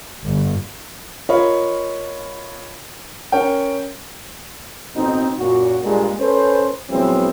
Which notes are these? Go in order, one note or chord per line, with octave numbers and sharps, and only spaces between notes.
G1
F4 A#4 C#5 D#5 B5
C#4 A#4 C#5 G5
A1 B2 C4 D#4
F#2 A#2 F#4
G2 A#2 G3 G#3
C#4 A4 B4 C5
A#1 E3 F#3 G#3 B3 C4